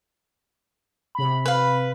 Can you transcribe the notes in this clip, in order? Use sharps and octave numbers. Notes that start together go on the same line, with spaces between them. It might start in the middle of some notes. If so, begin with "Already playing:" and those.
C3 B5
B4 F5